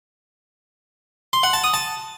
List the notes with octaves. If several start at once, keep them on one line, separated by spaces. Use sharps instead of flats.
C6
F#5
A5
D#6
A5